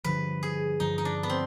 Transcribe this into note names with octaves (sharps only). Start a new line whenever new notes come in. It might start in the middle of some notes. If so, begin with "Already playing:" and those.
G2 D3 F3 B4
G#4
G2 D3 F3 D#4
D#4
D4
B3
C4